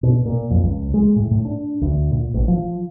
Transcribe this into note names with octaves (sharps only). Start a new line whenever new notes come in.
B2
A#2
F2
C#2
G#3
A2
A2
D4
D2
A#2
A1
F3